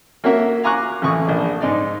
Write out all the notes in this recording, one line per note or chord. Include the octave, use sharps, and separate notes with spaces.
A#3 C#4 F#4 A#4 E5
F5 G#5 A#5 C#6 D6 F#6
A1 E3 C#6 D#6
A#1 D4
G#2 D#4 D5